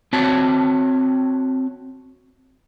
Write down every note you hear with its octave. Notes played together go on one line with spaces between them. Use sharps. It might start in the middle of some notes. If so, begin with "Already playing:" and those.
C4 F#4 C#5 A5